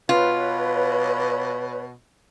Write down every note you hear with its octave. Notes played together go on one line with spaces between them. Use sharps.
B2 F4 B4 C#5